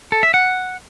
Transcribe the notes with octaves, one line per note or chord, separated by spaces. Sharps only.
A4
E5
F#5